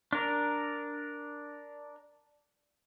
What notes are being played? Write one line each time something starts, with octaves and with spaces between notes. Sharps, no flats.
D4 A#4